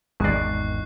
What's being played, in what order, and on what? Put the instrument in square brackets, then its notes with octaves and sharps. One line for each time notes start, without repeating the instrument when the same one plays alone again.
[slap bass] G#1 E2 D#3 [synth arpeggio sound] G#3 D5 [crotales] C#6 F#6 C7